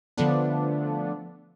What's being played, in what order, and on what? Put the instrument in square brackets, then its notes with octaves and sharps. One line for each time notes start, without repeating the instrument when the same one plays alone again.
[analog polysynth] D3 F3 A3 B3 D4